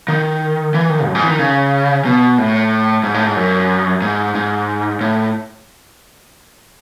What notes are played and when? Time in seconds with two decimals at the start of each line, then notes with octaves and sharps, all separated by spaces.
0.08 D#3
0.74 E3
0.90 D#3
1.06 F#2
1.15 G#2
1.23 E3
1.31 D#3
1.39 C#3
2.05 B2
2.38 A2
3.03 G#2
3.14 A2
3.26 G#2
3.36 F#2
4.02 G#2
4.35 G#2
5.01 A2